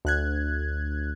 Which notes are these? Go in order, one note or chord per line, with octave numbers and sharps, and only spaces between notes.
D2 F#6 G#6